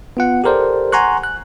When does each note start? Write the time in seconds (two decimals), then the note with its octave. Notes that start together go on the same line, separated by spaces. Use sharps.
0.17 B3 F4 F#5
0.44 G4 A4 A#4 C5 D5
0.92 F#5 G#5 A#5 C6 C#6 F#6
1.24 F#6